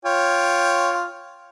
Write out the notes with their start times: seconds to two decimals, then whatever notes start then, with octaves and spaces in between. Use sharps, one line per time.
0.05 F4 C#5 G5